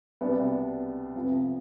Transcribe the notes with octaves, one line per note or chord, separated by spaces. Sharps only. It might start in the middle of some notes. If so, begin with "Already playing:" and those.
C2 B2 B3 D4 G4
F2 C3 F3 B3